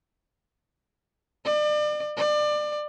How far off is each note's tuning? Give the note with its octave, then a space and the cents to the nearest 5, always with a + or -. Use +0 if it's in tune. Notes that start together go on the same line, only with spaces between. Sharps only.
D5 +35
D5 +30